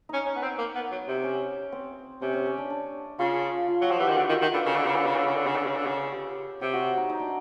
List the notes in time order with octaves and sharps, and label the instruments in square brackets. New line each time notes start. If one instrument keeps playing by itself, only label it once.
[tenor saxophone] C#4 [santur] D#4
[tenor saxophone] C#4
B3
C4
A#3
B3
F#3
C3
[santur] C#4
C4
[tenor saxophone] C3 [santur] C#4
[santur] C#4
C#4
D4
D4
[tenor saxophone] C#3 [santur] F4
[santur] F4
[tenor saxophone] F#3 [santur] F#4
[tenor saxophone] F3
[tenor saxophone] E3 [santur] G4
[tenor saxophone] D#3
[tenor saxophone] D3 [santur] F#4
[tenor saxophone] D#3 [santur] F4
[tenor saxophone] D#3 [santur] F4
[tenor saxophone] D3 [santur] B4
[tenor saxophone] C#3 [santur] A#4
[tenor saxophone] D3 [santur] B4
[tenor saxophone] C#3 [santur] C#5
[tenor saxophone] D3
[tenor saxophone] C#3 [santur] D5
[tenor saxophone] D3 [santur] C#5
[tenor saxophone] C#3
D3
C#3
D3
C#3
D3
C#3
[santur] G4
[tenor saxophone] C3 [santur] G4
[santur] F#4
D#4
D#4
D4